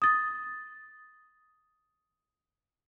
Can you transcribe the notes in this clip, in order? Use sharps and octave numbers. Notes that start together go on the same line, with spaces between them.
D#6 A6